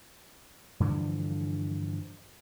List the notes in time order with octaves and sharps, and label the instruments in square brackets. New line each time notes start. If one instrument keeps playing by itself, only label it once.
[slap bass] G2 D3 E3 F3